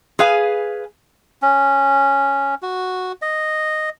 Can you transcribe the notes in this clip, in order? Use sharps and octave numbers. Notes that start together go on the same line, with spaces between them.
G#4 B4 F5 G#5
C#4
F#4
D#5